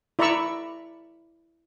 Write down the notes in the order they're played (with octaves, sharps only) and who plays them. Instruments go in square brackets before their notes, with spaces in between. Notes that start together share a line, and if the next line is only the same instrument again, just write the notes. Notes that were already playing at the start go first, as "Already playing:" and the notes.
[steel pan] E4 D5 A#5 B5 C#6 E6